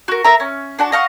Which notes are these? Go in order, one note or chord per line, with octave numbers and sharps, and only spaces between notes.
F#4 A#4
A#4 E5 A#5
C#4
D4 F#4 A5
D#5 F5 F#5 C#6